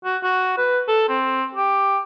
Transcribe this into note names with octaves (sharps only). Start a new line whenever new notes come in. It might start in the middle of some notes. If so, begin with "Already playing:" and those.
F#4
F#4
B4
A4
C4
G4